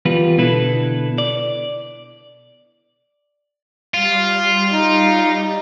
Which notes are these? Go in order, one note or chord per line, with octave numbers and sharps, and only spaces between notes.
E2 G3 F4 B4
B2 D3 E4 A4 B4
D5
G3 F4
D#4